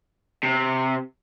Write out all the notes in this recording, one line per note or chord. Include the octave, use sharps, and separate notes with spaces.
C3